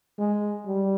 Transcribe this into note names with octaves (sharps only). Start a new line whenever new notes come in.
G#3
G3